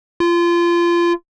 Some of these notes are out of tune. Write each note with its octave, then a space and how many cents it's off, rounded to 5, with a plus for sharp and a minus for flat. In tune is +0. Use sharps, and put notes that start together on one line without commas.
F4 -25